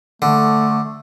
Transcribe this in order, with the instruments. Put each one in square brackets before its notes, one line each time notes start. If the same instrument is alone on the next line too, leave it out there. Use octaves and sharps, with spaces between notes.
[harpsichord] D3 [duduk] A3